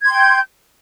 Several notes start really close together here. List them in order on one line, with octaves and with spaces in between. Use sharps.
G#6 C6 G5 G6